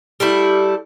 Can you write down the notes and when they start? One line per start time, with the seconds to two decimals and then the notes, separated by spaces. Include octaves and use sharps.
0.20 G3 A3 E4